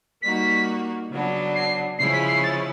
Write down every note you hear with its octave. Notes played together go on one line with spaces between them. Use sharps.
G3 A#3 D#4 F#4 B6
C#3 F#3 B3 D4
C7
C#3 F3 G#3 C#4 E4 C7
B6
C7
A6